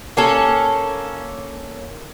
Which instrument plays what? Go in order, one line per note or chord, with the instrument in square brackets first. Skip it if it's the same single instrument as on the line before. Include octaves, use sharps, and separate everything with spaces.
[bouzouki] A#3 C#4 A4